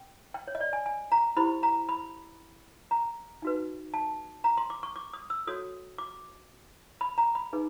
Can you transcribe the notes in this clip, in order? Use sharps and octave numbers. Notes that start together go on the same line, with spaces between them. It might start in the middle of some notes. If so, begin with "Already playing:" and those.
Already playing: G5
G5
C#5
D#5
D5
G#5
G#5
A#5
E4 G4 C5 B5
A#5
B5
A#5
D#4 F#4 B4
A5
A#5
C6
D6
C#6
D6
D#6
E6
F#4 A4 C#5 D#6
D6
B5
A#5
B5
D#4 G#4 B4